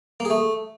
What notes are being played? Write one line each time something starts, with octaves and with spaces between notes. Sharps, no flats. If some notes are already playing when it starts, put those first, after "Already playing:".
A#3
G#4
A3